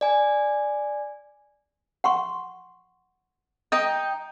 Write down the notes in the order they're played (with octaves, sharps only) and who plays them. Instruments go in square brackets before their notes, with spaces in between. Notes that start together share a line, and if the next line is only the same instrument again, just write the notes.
[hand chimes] D5 G#5
[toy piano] F#5 C6 C#6
[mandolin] D#4 D#5 G5 [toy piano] D#6